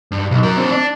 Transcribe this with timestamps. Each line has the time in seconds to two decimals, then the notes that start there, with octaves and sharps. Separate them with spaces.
0.12 G2
0.31 B1
0.43 F#3 A#4
0.57 C4 D4
0.72 D4